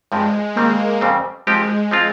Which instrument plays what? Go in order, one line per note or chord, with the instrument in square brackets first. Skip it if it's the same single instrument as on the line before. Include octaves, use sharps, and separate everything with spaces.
[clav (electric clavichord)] G2 F3 C4 G4 [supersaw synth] G#3
[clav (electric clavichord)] D#3 G3 C4 [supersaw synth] A#3
[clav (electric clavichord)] F2 C#3 G3 C4
[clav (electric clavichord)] F3 C4 G4 [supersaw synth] G#3
[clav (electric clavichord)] F3 C4 F4